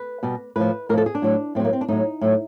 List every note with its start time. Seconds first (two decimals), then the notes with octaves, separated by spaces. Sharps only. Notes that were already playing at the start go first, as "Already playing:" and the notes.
Already playing: B4
0.23 B2 G3
0.56 A2 F3 B4
0.89 A2 A#4
0.93 F3 A4
1.06 G#4
1.15 D4
1.22 A2 F#3
1.55 A2 C4
1.60 F#3 A#3
1.73 C4
1.81 D4
1.88 A2 F#3 D#4
2.21 A2 F#3